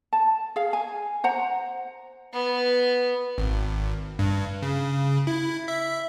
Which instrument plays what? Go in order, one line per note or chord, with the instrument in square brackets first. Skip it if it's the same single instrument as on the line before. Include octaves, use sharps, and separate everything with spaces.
[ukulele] A5
G#4 F5
G#5
C5 F#5 A#5
[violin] B3
[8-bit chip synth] G#1
G2
C#3
E4
E5